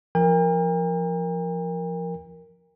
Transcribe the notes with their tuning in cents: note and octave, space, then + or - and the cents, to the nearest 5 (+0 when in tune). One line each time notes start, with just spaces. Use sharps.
F3 -10 A#4 +0 G5 +45